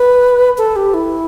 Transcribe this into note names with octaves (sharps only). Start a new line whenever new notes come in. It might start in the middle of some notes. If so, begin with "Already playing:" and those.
Already playing: B4
A4
G4
E4